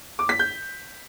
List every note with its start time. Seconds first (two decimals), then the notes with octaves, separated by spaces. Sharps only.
0.19 D6
0.29 B6
0.39 G6